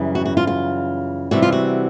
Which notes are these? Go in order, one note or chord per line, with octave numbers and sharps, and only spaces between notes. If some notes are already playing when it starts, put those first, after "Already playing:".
Already playing: F#2 C#3 E3 G3
F#4
F#4
F4
F4
C3 E3 G3 F#4
F4
F#4